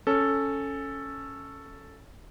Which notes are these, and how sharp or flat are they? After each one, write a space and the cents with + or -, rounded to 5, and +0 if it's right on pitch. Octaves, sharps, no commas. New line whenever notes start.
C#4 +0 A4 +0